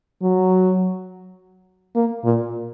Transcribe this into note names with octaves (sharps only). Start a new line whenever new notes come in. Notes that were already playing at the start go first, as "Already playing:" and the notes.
F#3
A#3
A#2